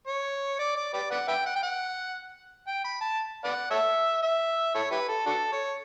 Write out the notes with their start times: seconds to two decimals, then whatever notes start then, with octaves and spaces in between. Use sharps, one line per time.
0.08 C#5
0.59 D5
0.76 D5
0.94 G4 B4 D5
1.11 B4 D5 F#5
1.28 B4 E5 G5
1.46 F#5
1.56 G5
1.63 F#5
2.67 G5
2.84 B5
3.01 A5
3.44 B4 D5 F#5
3.71 A4 C#5 E5
4.22 E5
4.75 E4 A4 C#5
4.91 E4 G4 B4
5.09 A4
5.26 D4 F#4 A4
5.52 C#5